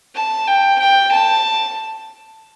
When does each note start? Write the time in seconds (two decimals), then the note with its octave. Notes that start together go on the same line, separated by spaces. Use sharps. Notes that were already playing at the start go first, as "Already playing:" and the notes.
0.15 A5
0.47 G5
0.80 G5
1.12 A5